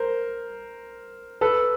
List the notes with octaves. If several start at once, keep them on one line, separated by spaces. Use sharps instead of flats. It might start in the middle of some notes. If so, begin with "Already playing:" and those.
Already playing: A#4 C5
A4 B4